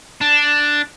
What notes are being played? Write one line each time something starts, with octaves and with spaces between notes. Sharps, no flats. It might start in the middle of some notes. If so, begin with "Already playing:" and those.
D4